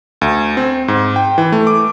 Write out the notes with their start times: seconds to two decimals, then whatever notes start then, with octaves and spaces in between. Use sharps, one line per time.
0.21 D2
0.57 C4
0.88 G#2
1.16 G5
1.38 E3
1.52 A3
1.67 D6